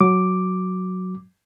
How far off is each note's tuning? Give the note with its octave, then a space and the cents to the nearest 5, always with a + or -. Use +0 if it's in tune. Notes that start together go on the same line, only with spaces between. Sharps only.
F#3 +0 D6 +0